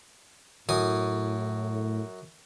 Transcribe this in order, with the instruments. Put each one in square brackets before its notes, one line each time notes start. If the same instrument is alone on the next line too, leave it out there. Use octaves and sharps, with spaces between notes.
[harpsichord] F#2 G#5 D#6 [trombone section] A2